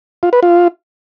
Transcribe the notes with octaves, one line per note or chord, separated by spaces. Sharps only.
F4
B4
F4